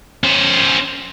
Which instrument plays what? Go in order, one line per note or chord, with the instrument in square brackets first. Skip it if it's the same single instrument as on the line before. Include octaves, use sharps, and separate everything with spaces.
[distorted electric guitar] C#4 C5